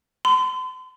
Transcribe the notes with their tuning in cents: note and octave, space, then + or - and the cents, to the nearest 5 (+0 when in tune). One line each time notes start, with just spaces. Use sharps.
C6 -40